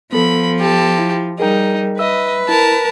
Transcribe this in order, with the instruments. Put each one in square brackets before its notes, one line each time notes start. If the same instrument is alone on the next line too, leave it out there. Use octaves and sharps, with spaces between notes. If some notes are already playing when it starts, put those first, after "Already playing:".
[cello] F3 [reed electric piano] B3 A4 [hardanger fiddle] B5
[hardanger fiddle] G4 A5
[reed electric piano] E4
[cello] G3 [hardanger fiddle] D#4 [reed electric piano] G#4 A#4 G5
[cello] B4 [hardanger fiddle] D#5 [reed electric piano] E5 E6
[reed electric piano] E4 [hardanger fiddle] A#4 A5